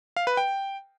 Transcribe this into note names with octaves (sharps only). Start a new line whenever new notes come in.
F5
B4
G5